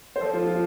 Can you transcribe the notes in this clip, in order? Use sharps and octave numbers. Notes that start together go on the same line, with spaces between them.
C5
F3 A4
F4
F4